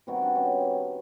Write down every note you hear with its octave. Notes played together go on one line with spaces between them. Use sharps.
C3 D#3 G3 B3 F#4
D4
C#4